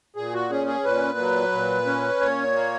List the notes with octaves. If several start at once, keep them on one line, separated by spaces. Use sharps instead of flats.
A#2 G#4
F#4
C#4 G#4
G#4
A#2 B4
F#3
A#2
C#4
A#2 C#5
A#3